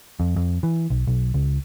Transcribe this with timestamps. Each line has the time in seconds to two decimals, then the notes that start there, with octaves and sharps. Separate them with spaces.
0.20 F2
0.36 F2
0.63 E3
0.90 B1
1.07 B1
1.34 C#2